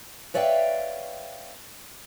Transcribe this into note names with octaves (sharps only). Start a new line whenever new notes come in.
B4 C#5 D5 E5 F5 G5